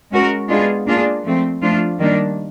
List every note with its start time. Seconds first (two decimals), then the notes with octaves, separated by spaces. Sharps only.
0.11 G#3 C#4 F#4 A#4
0.49 G#3 B3 D4 F4 G#4
0.87 A#3 D4 F4 G#4
1.24 F3 A3 C4
1.62 F3 A3 D4 F4
2.00 D#3 G3 A#3 D4